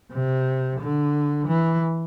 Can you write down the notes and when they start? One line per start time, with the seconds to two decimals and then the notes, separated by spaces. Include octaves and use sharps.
0.12 C3
0.81 D3
1.48 E3